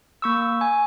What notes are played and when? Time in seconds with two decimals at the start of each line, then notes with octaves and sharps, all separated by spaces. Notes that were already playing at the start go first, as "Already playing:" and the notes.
0.22 A#3 C#6 E6
0.61 G#5